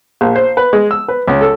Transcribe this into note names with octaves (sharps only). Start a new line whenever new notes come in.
A#1
C5
B4
G#3
E6
B4
C#2
A4